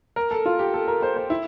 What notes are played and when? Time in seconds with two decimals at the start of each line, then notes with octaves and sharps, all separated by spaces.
0.16 A#4
0.31 A4
0.46 F4
0.59 G4
0.74 A4
0.88 A#4
1.02 C5
1.16 C5
1.30 E4